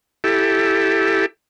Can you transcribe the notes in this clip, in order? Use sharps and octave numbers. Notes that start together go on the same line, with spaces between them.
E4 G4 A4